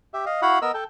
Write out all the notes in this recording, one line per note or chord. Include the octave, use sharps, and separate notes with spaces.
G4 E5
D#5 F5
E4 F#4 F5 F#5 B5
B3 A#4 D#5 E6
A4 G5